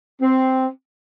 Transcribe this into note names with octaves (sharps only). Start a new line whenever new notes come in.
C4